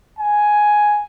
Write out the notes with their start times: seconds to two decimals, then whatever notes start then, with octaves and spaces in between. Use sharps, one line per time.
0.19 G#5